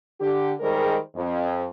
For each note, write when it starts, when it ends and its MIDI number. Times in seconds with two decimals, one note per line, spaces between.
0.21 0.53 50
0.21 0.53 67
0.60 0.98 51
0.60 0.98 55
0.60 0.98 56
0.60 0.98 68
0.60 0.98 70
0.60 0.98 72
1.16 1.66 41